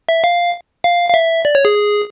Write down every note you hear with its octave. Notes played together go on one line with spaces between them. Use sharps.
E5
F5
F5
F5
E5
D5
C#5
G#4